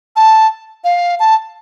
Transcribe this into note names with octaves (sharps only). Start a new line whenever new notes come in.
A5
F5
A5